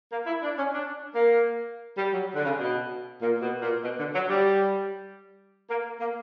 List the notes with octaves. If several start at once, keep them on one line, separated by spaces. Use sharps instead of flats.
A#3
E4
D4
C#4
D4
A#3
G3
F#3
D3
C#3
B2
A#2
B2
A#2
B2
D3
F#3
G3
A#3
A#3